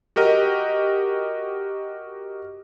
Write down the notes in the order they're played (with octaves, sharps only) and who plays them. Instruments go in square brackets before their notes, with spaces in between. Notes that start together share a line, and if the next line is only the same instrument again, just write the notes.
[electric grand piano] F#4 G4 A#4 D#5